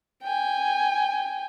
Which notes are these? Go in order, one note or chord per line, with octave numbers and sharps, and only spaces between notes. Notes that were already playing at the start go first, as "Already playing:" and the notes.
G5 G#5